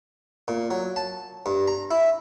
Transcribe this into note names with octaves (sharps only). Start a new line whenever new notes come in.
A#2
F#3
A5
G2
A#5
E4